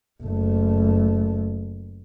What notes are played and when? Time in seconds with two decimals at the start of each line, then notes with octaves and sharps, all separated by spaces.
0.23 F#1 A3